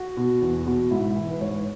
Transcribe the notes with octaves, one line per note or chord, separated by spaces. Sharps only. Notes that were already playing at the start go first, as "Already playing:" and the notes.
Already playing: F#4
B2
E2
B2
G#2 E4
E3
B4
G#2 C#5